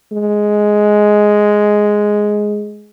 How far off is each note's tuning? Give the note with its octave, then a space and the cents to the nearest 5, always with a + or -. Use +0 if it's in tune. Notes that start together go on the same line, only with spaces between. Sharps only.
G#3 +5